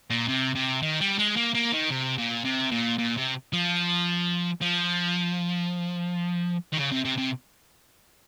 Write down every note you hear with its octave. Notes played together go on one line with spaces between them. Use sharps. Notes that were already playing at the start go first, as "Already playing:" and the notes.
A#2
C3
C3
D#3
G3
G#3
A#3
A#3
D#3
C3
A#2
C3
A#2
A#2
C3
F3
F3
D#3
C#3
C3
C3
C3